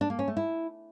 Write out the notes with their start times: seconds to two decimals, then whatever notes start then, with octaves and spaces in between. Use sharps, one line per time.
0.01 D4
0.10 A#3
0.19 C#4
0.28 A3
0.37 E4